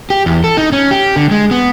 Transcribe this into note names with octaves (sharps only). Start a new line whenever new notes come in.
G4
E2
A4
D#4
C#4
G4
D3
G#3
B3